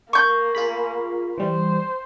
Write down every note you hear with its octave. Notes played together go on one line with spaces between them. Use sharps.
A#3 C#6 G6
F4 G#4 B5
E3 G3 C5